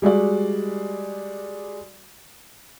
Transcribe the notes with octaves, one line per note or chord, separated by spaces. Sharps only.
G3 G#3 F#4 D5